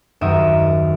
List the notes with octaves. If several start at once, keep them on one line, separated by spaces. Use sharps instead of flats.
D#1 F#2 D#3 A#4 E5 D#6